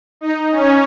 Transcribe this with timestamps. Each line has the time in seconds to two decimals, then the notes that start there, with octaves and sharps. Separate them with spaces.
0.21 D#4
0.51 C#4